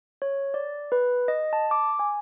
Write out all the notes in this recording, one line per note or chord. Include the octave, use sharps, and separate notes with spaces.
C#5
D5
B4
D#5
A5
D6
G#5